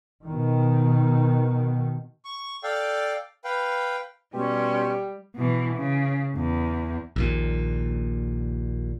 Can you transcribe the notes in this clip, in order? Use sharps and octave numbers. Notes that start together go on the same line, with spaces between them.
B2 D#3
C#6
A4 D5 F5 G5
B4 F5 G5
B2 G3 C#4 G4 C6
B2 E3
C#3
E2
A#1 D#2 A#2